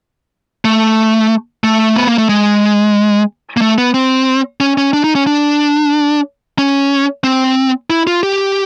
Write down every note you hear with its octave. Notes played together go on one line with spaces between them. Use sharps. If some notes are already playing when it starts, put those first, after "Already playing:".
A3
A3
B3
A#3
A3
G#3
A#3
A3
B3
C4
C#4
C#4
D4
D#4
C#4
D4
C#4
C4
E4
F4
G4